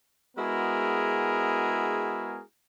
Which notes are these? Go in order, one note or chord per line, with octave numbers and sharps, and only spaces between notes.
G#3 B3 E4 F#4 G#4 A#4